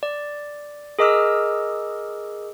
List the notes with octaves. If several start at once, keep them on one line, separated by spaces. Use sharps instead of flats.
D5
G#4 A#4 D#5 D6 E6 F6